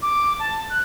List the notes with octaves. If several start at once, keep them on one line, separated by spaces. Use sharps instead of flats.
D6
A5
F#6